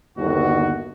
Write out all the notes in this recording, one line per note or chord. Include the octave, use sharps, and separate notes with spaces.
G1 D#2 F#4